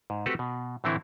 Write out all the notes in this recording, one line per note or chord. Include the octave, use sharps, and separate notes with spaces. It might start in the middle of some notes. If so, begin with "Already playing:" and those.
G#2
A3 C4 F#4 G4 A4 B4
B2
A2 D3 E3 A3 C4 E4